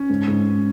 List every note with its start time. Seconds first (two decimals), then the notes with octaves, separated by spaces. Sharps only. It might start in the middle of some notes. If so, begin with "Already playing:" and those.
Already playing: C#4
0.10 G#2
0.28 G#2